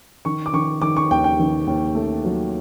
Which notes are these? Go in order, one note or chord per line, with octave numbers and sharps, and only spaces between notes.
D#3 C#6
D6
D#3 C#6
D#3 D6
C#6
D#2 G5
G5
D#3
D#2
A3
F#3